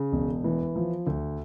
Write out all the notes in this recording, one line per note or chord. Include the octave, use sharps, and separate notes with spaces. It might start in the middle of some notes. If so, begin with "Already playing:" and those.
Already playing: C#3
E1
E3
F3
D2